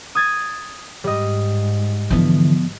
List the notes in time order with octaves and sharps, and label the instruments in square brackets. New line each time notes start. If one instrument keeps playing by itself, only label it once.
[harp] D#6 G#6 A6
[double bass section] G#2 [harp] G3 D#5
[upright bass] D3 E3 [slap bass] F3 B3